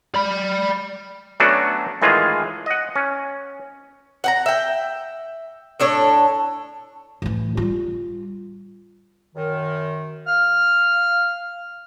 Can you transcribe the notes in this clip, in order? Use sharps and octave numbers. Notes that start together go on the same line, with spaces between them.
D5 B5
F#3 A3 B3 C#4 D4 F#4
A2 D#3 E3 G#3 F4 G#4
D#5 F#5
C#4
F#5 G5 A#5
E5 G5
A2 D4 A4 C#5
A2 E3
G3 F4
F#2 D#3
F5 F6